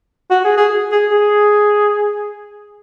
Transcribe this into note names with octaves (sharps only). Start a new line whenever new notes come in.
F#4
G#4
G#4
G#4
G#4